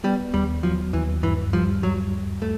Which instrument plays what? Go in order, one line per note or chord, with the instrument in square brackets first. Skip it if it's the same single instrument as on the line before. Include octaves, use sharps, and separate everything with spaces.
[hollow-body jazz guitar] G3 [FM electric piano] B3
[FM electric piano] D#2 [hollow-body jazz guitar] G3
[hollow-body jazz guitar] F3 [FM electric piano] F#3
[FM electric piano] D#2 [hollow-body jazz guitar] E3
[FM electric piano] G2 [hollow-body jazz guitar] E3
[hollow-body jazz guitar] F3 [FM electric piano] G3
[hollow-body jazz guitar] F#3 [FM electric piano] G3
[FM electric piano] G3
[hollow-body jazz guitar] A3